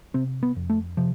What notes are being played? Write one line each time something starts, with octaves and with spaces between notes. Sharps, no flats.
C3 C4
B3
F2
A3
C3 F3